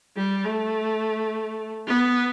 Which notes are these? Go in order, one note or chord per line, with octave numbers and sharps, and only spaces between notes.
G3
A3
B3